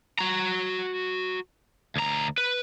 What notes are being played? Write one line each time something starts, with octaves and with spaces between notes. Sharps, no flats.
F#4 A#5
D2 A#5
B4